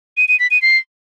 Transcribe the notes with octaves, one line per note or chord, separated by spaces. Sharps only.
D#7
D#7
B6
D#7
C7